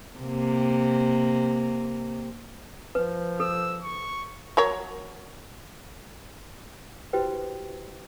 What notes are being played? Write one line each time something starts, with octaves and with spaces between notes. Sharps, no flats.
C3 A#3
F3 B4
A4 E6
C#6
F#3 A#4 C#5
E4 F#4 G4 B4 C5 G5